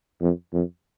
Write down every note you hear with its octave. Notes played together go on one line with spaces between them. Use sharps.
F2
F2